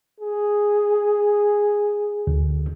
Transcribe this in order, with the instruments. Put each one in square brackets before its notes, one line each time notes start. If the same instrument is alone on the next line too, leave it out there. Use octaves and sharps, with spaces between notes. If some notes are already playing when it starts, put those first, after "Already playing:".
[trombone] G#4
[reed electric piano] D2